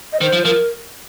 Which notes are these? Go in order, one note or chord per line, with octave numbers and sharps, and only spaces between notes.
D#5
D#3 C5
F3
F3 A#4